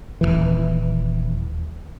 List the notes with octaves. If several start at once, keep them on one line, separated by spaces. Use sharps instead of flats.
D#1 C2 E3